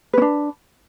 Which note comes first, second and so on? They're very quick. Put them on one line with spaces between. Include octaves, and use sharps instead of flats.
B4 C#4 D4